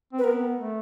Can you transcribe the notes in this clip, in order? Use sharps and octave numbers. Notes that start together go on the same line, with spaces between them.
C4
B4
B3 A#4
A3